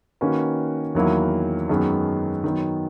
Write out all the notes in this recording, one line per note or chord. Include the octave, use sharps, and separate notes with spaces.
D#3 A#3 C#4 F#4 B4
E2 D#3 F#3 A#3 E4
F#2 D#3 G#3 B3 F#4
D#3 F#3 B3